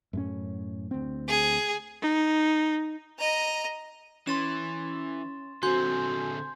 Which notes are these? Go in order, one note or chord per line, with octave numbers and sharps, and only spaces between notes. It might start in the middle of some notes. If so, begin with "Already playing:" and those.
F#2 A2 C#4
D2 C4
G#4
D#4
D#5 A#5
E3 C#4 C6 A6 E7
D3 C4 F#4 G#5 C6 G6